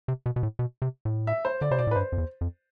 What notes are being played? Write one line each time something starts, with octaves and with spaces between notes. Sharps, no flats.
C3
B2
B2
A2
B2
C3
A2
E5
C5
D3 D5
C3 C5
B2 D5
A2
B4
G2 C5
F2
E2
F2